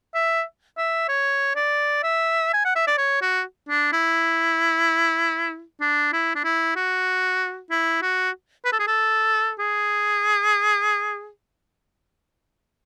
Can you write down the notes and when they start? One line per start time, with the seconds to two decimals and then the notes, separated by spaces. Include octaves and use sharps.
0.14 E5
0.77 E5
1.08 C#5
1.56 D5
2.03 E5
2.54 G#5
2.65 F#5
2.76 E5
2.87 D5
2.98 C#5
3.22 F#4
3.69 D4
3.93 E4
5.81 D4
6.13 E4
6.36 D4
6.44 E4
6.76 F#4
7.70 E4
8.02 F#4
8.65 B4
8.73 A4
8.80 G#4
8.87 A4
9.59 G#4